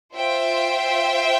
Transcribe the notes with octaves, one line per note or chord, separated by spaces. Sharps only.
F4 C5 E5 G5